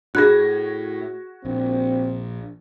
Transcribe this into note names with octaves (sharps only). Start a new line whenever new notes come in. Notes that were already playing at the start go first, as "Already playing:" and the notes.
A2 F#4 G#4 B5 F#6 G#6 A#6
A#1 C4